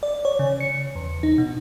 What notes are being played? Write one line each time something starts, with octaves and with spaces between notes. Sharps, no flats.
D5
C#5
C#3
C#7
E2
D#4
B2